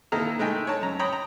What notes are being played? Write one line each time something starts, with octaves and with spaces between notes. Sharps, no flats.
D#3 A#3 E4 A4 A#4 A#5
G#3 A3 D#4 G5 G#5
C#5 A5
F#2 A#5
C#5 G5 A#5 B5 D#6
A#5